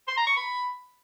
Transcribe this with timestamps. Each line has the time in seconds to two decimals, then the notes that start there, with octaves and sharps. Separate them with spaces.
0.08 C6
0.17 A#5
0.27 C#6
0.37 B5